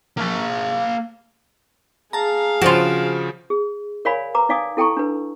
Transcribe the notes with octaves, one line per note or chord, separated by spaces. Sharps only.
A#3 A5
G#4 F5 A5 A#5
C#3 F3 F4 F#4 C5 D7 E7
G#4
A#4 C#5 D5 F5 G#5 B5
B4 A#5 D6
D#4 D5 F5 G#5 D6 D#6
E4 A4 G5 A5 A#5 C#6
D4 B4